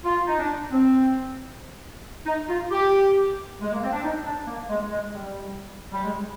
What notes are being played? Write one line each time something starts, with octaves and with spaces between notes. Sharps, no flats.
F4
D#4
D4
C4
D#4
F4
G4
G#3
A#3
C4
D4
D#4
D4
A#3
G#3
G#3
G3
G3
G#3